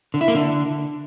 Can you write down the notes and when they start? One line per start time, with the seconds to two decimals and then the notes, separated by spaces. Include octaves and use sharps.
0.14 D3
0.21 E4
0.28 A#3
0.35 D3